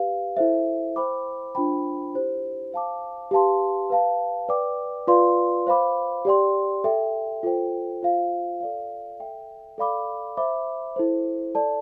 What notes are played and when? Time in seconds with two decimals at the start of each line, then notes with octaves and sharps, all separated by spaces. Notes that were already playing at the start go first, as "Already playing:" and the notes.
Already playing: G4 B4 F5
0.37 E4 A4 C5 E5
0.96 C5 G5 B5 D6
1.55 D4 F4 C5 G5 B5
2.14 E4 G4 C5
2.72 C5 F5 A5 D6
3.31 G4 B4 F5 A5 C6
3.90 B4 F5 A5
4.49 B4 D5 G5 D6
5.07 F4 B4 D5 F5 C6
5.67 C5 F5 B5 D6
6.25 G4 D5 G5 C6
6.84 A4 E5 G5
7.43 F4 A4 C5 G5
8.02 F4 C5 F5
8.60 A4 D5 F5
9.20 A4 E5 G5
9.78 A4 D5 F5 B5 D6
10.37 C5 E5 B5 D6
10.96 E4 A4 C5
11.55 A4 D5 A5